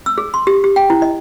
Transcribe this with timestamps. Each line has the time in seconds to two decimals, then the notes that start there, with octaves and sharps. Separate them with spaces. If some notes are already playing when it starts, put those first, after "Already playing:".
0.06 E6
0.18 G#4
0.34 C6
0.47 G4
0.64 G4
0.76 G5
0.90 E4
1.02 D#5